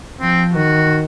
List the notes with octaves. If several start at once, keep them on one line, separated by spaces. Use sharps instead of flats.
F3 C4
D#3 F#4